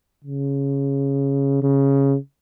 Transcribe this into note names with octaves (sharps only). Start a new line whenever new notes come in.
C#3
C#3